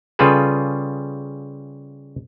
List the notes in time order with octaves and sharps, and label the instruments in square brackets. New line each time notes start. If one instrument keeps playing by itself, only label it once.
[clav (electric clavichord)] C#3 G3 F4 G#4 A4 B4